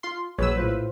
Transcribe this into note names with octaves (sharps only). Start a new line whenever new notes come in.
F4 C6
A#1 F#3 G#4 B4 C#5 E6
A2 F4 C5